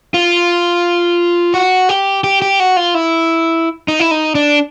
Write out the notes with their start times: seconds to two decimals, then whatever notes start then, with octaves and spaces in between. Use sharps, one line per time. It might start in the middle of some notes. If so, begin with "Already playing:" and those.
0.14 F4
1.54 F#4
1.89 G4
2.24 G4
2.42 G4
2.60 F#4
2.77 F4
2.95 E4
3.88 D#4
4.00 E4
4.11 D#4
4.35 D4